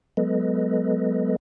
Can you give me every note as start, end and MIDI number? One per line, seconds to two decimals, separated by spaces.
0.17 1.36 54
0.17 1.36 56
0.17 1.36 59
0.17 1.36 69
0.17 1.36 71
0.17 1.36 75